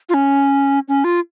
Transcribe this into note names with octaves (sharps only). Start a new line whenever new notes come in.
F4
C#4
C#4
F4